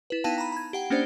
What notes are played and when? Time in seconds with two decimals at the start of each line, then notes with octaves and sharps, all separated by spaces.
0.10 E4 B4
0.24 B3 D#4 E4 F5 G5 A5
0.38 A#5 B5
0.52 B5 G#6
0.73 G4 F#5 G5
0.90 A#3 C#4 D4 G4 C5 D5